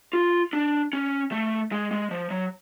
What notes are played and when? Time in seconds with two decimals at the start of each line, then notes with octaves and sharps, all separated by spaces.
0.13 F4
0.53 D4
0.93 C#4
1.32 A3
1.72 G#3
1.91 G#3
2.11 F3
2.31 F#3